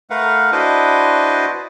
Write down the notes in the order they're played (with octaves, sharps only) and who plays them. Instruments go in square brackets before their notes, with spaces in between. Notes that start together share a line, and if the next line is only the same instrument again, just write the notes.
[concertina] A3 A#4 B4 F5 F#5
D4 E4 F#4 B4 C5 D#5